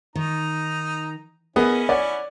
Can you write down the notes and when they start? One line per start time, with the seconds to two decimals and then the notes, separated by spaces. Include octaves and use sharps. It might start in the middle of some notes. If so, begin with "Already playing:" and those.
0.15 D#3 D#4 A#5
1.56 B3 C#4 E4 G#4 A#4 D#5 G#5
1.89 C#5 D5 F#5